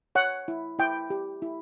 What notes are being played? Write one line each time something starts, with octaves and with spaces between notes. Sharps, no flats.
C#5 F#5
E4
E4 G5
G4
E4